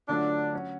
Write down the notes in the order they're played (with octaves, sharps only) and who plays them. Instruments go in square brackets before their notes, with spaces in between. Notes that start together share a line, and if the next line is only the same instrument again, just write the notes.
[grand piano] D3 F#3 A3 F4 [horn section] D4
[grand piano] F#3 C#4 F#4